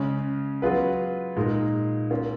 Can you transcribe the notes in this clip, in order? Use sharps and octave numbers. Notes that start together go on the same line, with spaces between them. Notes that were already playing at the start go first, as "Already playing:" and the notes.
Already playing: C#3 G#3 C#4
F#3 B3 F4 G#4 B4
A#2 G#3 D#4 A#4
A#3 C#4 F4